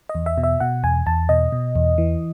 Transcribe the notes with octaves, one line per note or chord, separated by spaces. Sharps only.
D#5
E2
E5
B2
E5
B2 F#5
E2 G#5
E2 A5
B2 D#5
B2
E2
E3